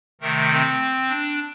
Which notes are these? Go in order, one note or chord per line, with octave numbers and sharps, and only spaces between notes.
C3 D#3 A3 A#4
C4
D4